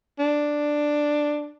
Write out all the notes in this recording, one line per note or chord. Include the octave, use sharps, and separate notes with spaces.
D4